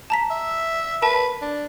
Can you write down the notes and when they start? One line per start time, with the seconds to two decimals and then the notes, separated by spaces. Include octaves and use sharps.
0.10 A5 A#5 B6
0.30 E5
1.02 A#4 B4 A5
1.41 D4